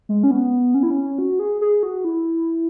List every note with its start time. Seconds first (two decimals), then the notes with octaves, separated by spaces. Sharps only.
0.09 G#3
0.23 C#4
0.31 B3
0.74 C#4
0.83 E4
0.90 C#4
1.18 F#4
1.39 G#4
1.61 G#4
1.83 F#4
2.05 E4